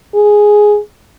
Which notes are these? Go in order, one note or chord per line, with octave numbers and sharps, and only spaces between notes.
G#4